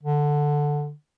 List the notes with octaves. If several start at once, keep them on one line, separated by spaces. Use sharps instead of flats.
D3